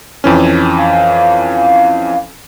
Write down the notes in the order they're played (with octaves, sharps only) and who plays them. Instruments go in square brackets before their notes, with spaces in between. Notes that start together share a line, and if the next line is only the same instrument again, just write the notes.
[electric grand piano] F2 E3 C#4
[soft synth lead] F5